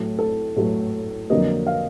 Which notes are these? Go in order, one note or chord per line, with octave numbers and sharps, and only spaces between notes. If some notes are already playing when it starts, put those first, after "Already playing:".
Already playing: A2 F#3 A3
A4
A2 F#3 A3
F2 D3 F#3 A#3 D#5
F5